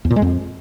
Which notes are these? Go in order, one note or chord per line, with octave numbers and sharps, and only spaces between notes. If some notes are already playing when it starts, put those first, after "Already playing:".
E2
A#2
G#3
F2